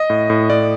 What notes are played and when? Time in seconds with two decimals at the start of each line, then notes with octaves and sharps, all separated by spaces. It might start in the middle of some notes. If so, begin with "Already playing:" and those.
Already playing: D#5
0.10 A2
0.30 A2
0.50 A2 D5